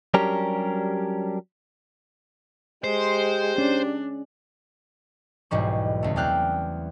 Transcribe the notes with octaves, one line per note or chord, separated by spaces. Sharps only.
F#3 G3 C#4 D4 G4 A#4
G#3 G4 C5
C#4 D4
E1 B1 G#2 G3 C#6
C#2 A3
E2 C4 D5 G5 F6 F#6